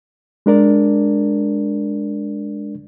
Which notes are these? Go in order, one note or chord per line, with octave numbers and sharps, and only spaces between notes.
G#3 D4 A#4 D5